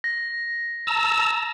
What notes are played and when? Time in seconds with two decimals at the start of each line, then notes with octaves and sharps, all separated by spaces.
0.04 A#6
0.87 A5 A#5 E6